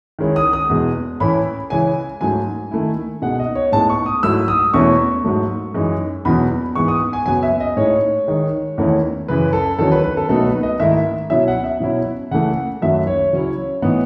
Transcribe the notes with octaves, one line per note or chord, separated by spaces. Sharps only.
D#3 G#3 C#4 E4
D#6
D#6
E2 B2 G#3
A2 E3 A3 C#4 E4 B5
C#3 E3 G#3 C#4 E4 G#5
G#2 F#3 A3 G#5
D#3 A3 E4
B2 G#3 D#4 F#5
D#5
C#5
A2 G#3 B3 D#4 A5
C#6
D#6
G#2 F#3 A3 E4 E6
D#6
E2 B2 A3 C#4 E4 C#6
G#2 F#3 A3
F#2 E3 G#3 D#4
E2 B2 F#3 B5
G#2 E3 G#3 B3 C#6
D#6
G#5
F#2 C#3 F#3 B3 G#5
E5
D#5
A2 G#3 D#4 C#5
D#3 G#3 D#4
E2 D#3 A3 C#4 E4
F#2 C#3 E3 B4
A4
E2 D#3 F#3 C#4 A4
B4
B4
A4
B2 F#3 A3 D#4 A4
B4
D#5
G#2 D#3 A3 E4 E5
B2 F#3 C#4 E4 E5
F#5
E5
B2 F#3 C#4 E4
C#3 E3 A3 F#5
F#2 D#3 F#3 A3 E5
C#5
C#3 F#3 C#4 E4
A2 E3 B3 D#4